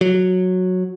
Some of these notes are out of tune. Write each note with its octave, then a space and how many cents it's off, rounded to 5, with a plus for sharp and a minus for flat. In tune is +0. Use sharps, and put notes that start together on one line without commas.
F#3 -10